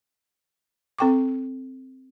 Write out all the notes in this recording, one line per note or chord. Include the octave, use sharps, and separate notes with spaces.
C4 A4 G5 C#6 D6